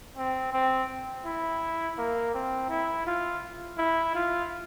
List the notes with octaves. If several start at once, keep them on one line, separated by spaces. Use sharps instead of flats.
C4
C4
E4
A#3
C4
E4
F4
E4
F4